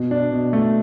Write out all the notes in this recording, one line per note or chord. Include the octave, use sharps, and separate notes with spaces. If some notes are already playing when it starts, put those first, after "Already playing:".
Already playing: B2
D4
B2
A3